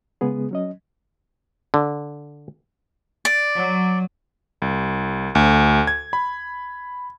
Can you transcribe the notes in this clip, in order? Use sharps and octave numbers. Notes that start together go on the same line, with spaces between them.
C#3 G#3 B3 G#4
F#3 C#4 D#5
D3
D5
F#3
C2
D2
G#6
B5